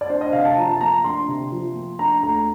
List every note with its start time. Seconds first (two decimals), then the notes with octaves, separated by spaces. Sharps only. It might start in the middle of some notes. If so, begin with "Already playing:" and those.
0.01 D5
0.09 D4 C5
0.21 D#5
0.33 C3 F5
0.45 A5
0.57 F3 A#5
0.71 A5
0.81 A#3 A#5
1.04 D4 C6
1.28 C3
1.52 F3
1.75 A#3
1.99 D4 A#5
2.23 D2 A#5